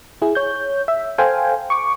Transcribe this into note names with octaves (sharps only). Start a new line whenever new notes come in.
E4 G#4
C#5 G6
E5
A4 C5 F5 G5 G#5
C#6 D6